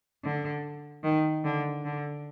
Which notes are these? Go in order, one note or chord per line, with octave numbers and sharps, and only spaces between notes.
D3
D#3
D3
D3